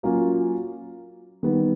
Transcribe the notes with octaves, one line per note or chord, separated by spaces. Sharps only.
F#3 A#3 C#4 F4
D#3 G3 B3